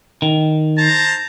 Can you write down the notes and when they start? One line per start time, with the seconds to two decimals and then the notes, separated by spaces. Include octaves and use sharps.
0.22 D#3
0.78 C5 A5 A#5